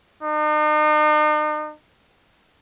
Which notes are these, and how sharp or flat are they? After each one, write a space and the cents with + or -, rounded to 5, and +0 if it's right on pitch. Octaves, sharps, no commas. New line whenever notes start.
D#4 -45